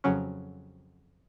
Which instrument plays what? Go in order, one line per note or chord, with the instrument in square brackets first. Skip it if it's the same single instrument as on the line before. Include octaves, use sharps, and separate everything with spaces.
[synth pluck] F2 C#3 F#3 C#4